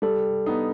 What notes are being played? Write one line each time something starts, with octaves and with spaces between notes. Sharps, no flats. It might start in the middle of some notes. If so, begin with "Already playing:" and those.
G3 A4
B3 D#4